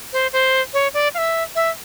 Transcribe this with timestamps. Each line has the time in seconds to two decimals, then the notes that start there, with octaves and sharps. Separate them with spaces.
0.13 C5
0.33 C5
0.74 C#5
0.94 D5
1.14 F5
1.18 E5
1.55 E5